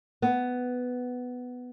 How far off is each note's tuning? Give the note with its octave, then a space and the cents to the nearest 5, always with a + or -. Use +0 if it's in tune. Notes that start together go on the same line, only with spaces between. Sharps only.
B3 +10